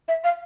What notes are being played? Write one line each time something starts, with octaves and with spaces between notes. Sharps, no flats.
E5
F5